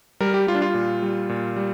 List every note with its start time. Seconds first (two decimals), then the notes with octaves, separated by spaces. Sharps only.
0.20 G3 A#4
0.34 G4
0.47 G3 F4
0.55 D4
0.62 F4
0.74 A#2
1.02 G3
1.29 A#2
1.56 G3